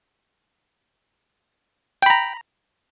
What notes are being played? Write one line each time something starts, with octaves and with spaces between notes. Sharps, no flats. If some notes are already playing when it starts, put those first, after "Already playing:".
G5 A#5 B5